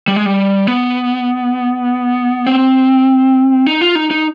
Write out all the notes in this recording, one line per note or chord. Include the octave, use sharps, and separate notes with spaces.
G3
G#3
G3
B3
C4
D#4
F4
D#4
D#4